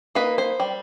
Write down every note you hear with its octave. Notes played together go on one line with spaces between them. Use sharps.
A#3 D#4 B4
C5
G3